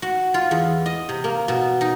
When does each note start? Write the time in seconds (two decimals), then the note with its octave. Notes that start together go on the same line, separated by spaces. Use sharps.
0.02 F#4
0.34 F4
0.51 E2
0.86 D#5
1.09 C3
1.24 A#3
1.48 B2
1.81 D#4